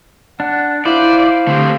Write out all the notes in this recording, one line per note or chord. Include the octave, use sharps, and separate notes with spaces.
D4 F#5
E4 B4 C5 D5 F5
D3 A3 C4 G4